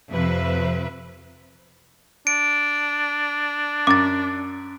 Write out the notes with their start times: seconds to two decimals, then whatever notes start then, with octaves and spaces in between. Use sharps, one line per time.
0.11 F2 C3 B4 E5
2.27 D4 D7
3.87 F#2 D6 A6